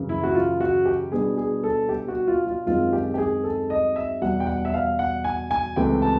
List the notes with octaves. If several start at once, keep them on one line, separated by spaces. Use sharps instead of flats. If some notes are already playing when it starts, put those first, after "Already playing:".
Already playing: F#2 C#3 E3
E4
F#4
F4
F#4
G4
B2 G3 B3 D4 G#4
G#4
A4
G4
F#4
F4
F4
F#2 D#3 G#3 C4 F4
G4
G4
G#4
A4
D#5
E5
E2 B2 G3 F#5
G5
F#5
E5
F5
F#5
G#5
G#5
C#2 C3 E3 A3 G5
A5